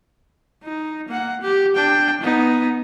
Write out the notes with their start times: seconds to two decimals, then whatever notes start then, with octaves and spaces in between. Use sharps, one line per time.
0.63 D#4
1.08 A#3 F#5
1.41 G4
1.75 D4 G5
2.21 B3 D#4